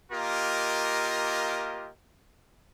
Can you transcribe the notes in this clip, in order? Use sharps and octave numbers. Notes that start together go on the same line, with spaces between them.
A#3 F4 G4 A#4 D#5